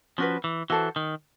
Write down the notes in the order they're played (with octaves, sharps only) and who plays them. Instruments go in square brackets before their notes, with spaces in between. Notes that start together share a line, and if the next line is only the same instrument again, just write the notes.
[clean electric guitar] F3 [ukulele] C#4 F#4 B4
[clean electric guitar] E3
[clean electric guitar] E3 [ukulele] F#4 A4 C5
[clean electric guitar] D#3